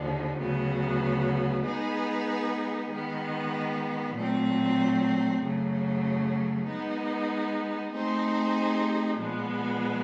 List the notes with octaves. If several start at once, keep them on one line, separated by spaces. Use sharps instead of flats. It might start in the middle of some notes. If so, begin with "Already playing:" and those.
Already playing: D#2 D3 F3
D2 C#3 F#3 B3
G#3 B3 D#4 G#4 B4
D#3 G#3 B3
A#2 F#3 A3 C4
F#2 C#3 F#3 A3
G#3 B3 D#4
A3 C4 D#4 G#4 C5
A#2 F3 G#3 B3